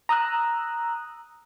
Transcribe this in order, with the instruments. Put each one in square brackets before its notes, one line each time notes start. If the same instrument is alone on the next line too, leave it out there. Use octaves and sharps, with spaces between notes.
[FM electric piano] A#5 D#6 E6 F#6